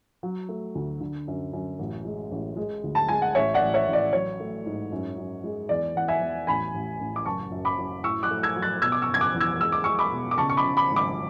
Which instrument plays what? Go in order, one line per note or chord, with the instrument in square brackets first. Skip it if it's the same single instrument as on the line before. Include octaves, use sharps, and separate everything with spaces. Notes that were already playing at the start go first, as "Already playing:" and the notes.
[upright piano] F#3
A3
D2
D3
F#2
F#2
A1
G#3
A1
G#3
D2
A5
G#3 G#5
F#5
A1 C#5 E5
D5 F#5
A1
C#5 E5
A1
D5
F#3 C#5
A3
G#2
F#2
F#2
G#3
E2 D5
E2 F#5
E5 G#5
E2
A1 G#5 B5
A1
A1
D6
F#1 A5 C#6
F#2
B5 D6
F#2
A2 C#6 E6
D6 F#6
A3
E6 G#6
F#3
F#6 A6
B2 E6 G#6
D6
C#6 E6
F#1
G#6
D6 F#6
E2
E6 G#6
G#3 E6
D6
G#3 C#6 E6
B5 D6
B2
D6
C#3 A5 C#6
C#6
B5 D6
C#3
B5 D6
G#1
B5 D6